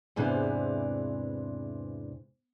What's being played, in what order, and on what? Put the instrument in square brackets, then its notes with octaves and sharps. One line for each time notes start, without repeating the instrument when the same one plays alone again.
[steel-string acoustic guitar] E2 G#2 C3 E3 D4